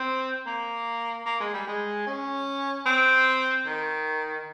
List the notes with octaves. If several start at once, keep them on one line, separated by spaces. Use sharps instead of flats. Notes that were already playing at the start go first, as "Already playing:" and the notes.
Already playing: C4
A#3
A#3
G#3
G3
G#3
C#4
C4
D#3